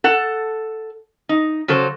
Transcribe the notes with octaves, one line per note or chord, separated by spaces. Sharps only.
A4 F#5
D#4
C#3 F#3 A4 C5